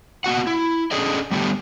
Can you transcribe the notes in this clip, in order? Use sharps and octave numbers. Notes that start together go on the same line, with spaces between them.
A#3 B3 F#4 F#5
E4
C#4 D4 G#4 A4 D5 D#5
G3 A3 B3 D4 G4